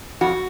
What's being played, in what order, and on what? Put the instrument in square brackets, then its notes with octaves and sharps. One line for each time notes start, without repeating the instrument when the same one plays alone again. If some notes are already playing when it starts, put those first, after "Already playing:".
[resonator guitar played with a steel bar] F2 F#4